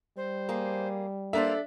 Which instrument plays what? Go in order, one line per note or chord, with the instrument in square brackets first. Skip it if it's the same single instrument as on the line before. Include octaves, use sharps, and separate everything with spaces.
[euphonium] G3 [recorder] C5
[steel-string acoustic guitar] A#3 G#4
[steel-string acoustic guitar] A#3 A#4 C5 [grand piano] D4 E5 [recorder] A4